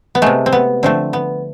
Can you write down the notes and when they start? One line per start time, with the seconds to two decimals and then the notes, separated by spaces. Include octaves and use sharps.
0.15 B3
0.22 C3 G#3 A3
0.46 C4
0.53 B3
0.83 D3 F3 A3 C4
1.13 B3